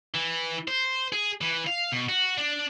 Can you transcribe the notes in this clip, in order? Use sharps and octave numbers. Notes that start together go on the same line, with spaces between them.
E3
C5
G#4
E3
F5
B2
F#4
D4